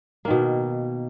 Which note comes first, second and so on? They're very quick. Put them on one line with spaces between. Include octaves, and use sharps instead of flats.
A#3 D#3 B2